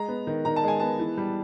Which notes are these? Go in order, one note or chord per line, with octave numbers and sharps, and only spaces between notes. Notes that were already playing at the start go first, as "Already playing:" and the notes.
Already playing: G#3 A#5
B3
D#3
D#3 A#5
A5
G#3 G#5
B3 A5
E3
G3